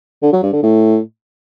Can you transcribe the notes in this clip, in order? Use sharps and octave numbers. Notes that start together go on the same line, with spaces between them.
D3
F#3
G2
D3
A2